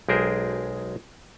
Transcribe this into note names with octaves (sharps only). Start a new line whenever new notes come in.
B1 G#3 G4 G#4 A#4 C5